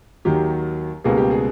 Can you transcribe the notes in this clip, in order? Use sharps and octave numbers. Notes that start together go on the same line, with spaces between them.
D#2 D#3 F#3 G4
C#2 B2 G3 A#3 G#4
G4
G#4